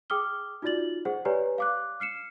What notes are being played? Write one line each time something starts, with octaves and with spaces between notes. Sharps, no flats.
G#4 G5 D6 D#6 F6 G7
D#4 F4 F#4 D5 A6 F#7
G#4 C5 F#5
G4 B4 C#5 D5 G#5 A#5
F5 D6 F#6
F6 C7 C#7 E7